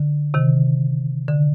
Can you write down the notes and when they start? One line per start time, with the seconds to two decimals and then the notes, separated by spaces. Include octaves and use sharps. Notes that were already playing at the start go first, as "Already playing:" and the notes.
Already playing: D3
0.34 C3 D#3
1.28 D3